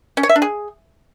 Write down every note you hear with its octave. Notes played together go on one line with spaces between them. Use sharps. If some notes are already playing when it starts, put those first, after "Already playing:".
C#4
C#5
E5
D4
G#4